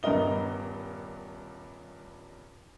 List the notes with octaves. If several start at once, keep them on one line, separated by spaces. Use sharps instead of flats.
D#1 G2 B3 A#4 D#5 G7